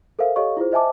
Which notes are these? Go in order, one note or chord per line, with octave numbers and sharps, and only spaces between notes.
A4 A#4 C5 E5 F5
G4 A4 C#5 D#5 F5 C#6
E4 F4 G#4 C5
C5 D#5 E5 G#5 A5 D6